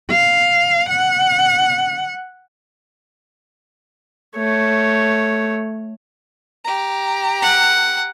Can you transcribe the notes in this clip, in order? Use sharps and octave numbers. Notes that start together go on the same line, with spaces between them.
F5
F#5
A3 C#5
G4 A#5
F#5